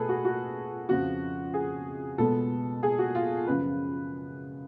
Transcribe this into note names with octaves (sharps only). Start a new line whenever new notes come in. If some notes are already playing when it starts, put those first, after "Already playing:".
Already playing: B2 A3 G#4 A4 B4
F#4
F#4
F2 C#3 F3 F#4
G#4
B2 G#3 B3 A4
G#4
F#4
F4
F#2 C#3 F3 B4